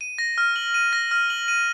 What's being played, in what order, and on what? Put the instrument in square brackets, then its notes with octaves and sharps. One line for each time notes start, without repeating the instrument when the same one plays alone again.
[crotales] D#7
A#6
F6
F#7
D#7
A#6
F6
F#7
D#7